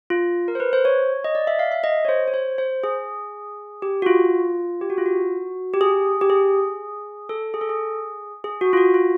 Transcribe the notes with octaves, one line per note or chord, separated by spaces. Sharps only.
F4
A#4
C5
B4
C5
C#5
D#5
D5
E5
F5
E5
D#5
C#5
C5
C#5
C5
C5
G#4
G4
F#4
F4
G4
F#4
F4
F#4
G4
G#4
G4
G#4
A4
G#4
A4
G#4
G#4
F#4
F4
F#4
F4